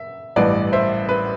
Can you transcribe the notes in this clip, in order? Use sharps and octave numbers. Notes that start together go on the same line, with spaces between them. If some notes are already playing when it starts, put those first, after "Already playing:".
Already playing: E5
A1 G2 E3 B4 D5
C5 E5
B4